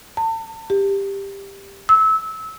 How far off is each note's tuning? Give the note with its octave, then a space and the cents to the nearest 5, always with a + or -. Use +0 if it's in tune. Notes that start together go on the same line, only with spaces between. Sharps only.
A5 +40
G4 +10
E6 -25